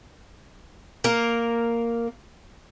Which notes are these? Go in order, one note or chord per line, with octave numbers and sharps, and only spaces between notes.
A#3 A#4